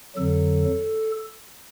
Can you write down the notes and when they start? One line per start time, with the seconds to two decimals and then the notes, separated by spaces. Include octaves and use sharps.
0.16 F2 D3 F#3 A4